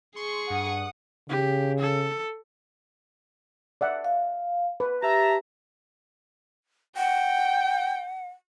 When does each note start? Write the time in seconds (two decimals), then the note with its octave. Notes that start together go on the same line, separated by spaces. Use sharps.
0.16 G#4 C6 C#6
0.50 G2 F#5 D#6
1.29 C#3 G4
1.79 A4
3.81 D5 E5 F#5
4.05 F5
4.80 B4
5.03 G4 E5 A5 A#5
6.97 F#5 G5